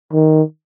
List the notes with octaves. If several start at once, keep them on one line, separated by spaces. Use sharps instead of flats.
D#3